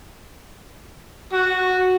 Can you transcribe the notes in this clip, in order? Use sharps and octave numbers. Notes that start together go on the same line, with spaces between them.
F#4